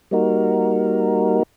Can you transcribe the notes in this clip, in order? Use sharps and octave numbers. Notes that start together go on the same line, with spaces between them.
G3 A#3 D#4 F#4 A#4